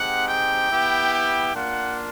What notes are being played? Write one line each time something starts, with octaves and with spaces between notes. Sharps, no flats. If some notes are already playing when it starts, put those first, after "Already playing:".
Already playing: G#3 C4 D#4 G4 F#5
G5
B3 E4 G4
G5
A#3 D4 F4 F#5